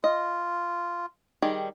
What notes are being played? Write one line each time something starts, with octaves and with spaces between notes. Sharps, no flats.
F4 D#5
D#3 G3 G#4